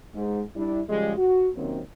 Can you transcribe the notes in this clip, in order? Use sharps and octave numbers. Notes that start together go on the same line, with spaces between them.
G#2
G3 D4 E4
C#3 F3 G3 G#3
F#4
C3 D#3 F#3 A#3 C4 C#4